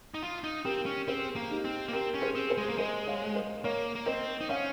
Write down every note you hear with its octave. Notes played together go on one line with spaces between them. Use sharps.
D#4
F4
D#4
C4 G4 A#4
C#4
C4 G#4 C5
A#3
D#4 G4
C4
A#3
C4 G4 A#4
C#4
G#4 C5
C4
G#4 C5
G#3
A#3
G#3 C5 D#5
C#5 F5
C5 D#5
A#3 A#4 C#5
A#3
C4 C5 D#5
D#4
C#4 C#5 F5